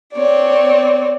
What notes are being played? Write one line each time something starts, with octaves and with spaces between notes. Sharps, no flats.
C4 C#5 D5